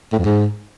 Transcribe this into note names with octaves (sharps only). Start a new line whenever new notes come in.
A2
F2
G#2